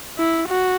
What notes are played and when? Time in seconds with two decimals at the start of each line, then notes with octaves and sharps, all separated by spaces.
0.18 E4
0.48 F#4